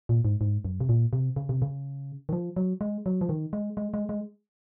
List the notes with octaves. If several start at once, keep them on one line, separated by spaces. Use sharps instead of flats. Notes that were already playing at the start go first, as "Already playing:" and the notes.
A#2
G#2
G#2
F#2
C3
A#2
C3
C#3
C3
C#3
D#3
F3
F#3
G#3
F#3
F3
D#3
G#3
G#3
G#3
G#3